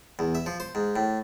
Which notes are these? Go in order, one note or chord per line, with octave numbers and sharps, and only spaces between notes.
E2
E5
F3
C5
G#2
A2